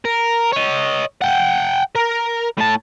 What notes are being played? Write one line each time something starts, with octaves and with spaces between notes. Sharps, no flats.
A#4
C#5 D#5
F#5 G5
A#4
A2 A5